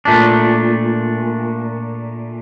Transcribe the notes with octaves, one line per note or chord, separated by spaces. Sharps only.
A#2 A3 D4